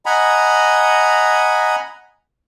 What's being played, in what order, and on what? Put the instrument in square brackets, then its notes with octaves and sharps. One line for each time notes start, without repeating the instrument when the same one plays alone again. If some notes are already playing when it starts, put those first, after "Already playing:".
[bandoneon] D#5 F#5 G#5 A#5 B5